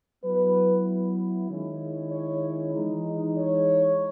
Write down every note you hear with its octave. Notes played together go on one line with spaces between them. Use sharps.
F#3 B3 E4 B4
D#3 G#3 C#4 E4
C#5
E3 G#3 D#4
C#5